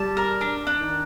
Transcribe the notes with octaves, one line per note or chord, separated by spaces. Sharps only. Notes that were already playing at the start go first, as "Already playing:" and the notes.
Already playing: G3 G4 A5
A#4
D4
D4
D#3 D#4